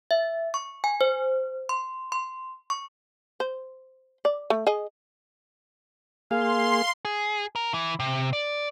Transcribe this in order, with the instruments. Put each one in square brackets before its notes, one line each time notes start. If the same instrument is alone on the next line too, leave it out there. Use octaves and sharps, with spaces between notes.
[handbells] E5
C#6
G#5
C5
C6
C6
C#6
[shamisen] C5
D5
A3
G#4 D#5
[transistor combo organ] A#3 G#4 [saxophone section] F5 [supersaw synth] C6
[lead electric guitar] G#4
A#4
E3
C3
D5